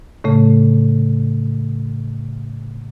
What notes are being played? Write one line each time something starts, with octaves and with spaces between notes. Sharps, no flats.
A2 C#3 A3